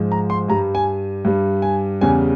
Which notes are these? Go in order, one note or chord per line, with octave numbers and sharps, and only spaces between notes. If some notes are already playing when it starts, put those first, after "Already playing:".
Already playing: G#2 F3 G#3
A#5
C6
G2 G3 A#5
G#5
G2 G3
G#5
E2 C#3 G3 G#5